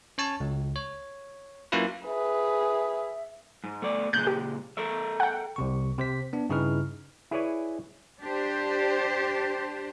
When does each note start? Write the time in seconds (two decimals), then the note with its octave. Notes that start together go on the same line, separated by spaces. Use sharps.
0.18 C#4 C#5 A5
0.40 C#2
0.76 C#5
1.72 F#3 A#3 C#4 E4 F4 B4
2.07 G#4 B4 E5
3.64 G#2
3.82 A3 B3 D5
4.13 A#2 C#3 G#3 F#6 G6
4.27 G4
4.77 A4 A#4 E5
5.20 F#5 G5
5.56 C2 C3 C#6
5.98 C3 C5 B6
6.33 B3 D4
6.50 G2 C#3 D#4 E4 B4 F6
7.31 E4 G#4 B4 C#5 D5 G#5
8.21 D4 G4 C5